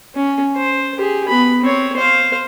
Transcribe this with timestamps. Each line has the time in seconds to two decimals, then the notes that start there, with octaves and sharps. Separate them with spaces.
0.15 C#4
0.56 C5
0.98 G4 G#4
1.28 B3 B5
1.61 C4 C#5
1.96 C5 F5